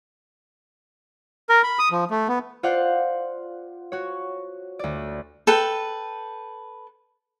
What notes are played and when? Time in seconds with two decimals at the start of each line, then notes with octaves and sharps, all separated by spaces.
1.49 A#4
1.63 B5
1.79 D#6
1.91 F3
2.11 A3
2.28 B3
2.63 F4 C5 D5 F5 F#5
3.92 F#4 C#5
4.79 D2 D5
5.47 A4 B4 G5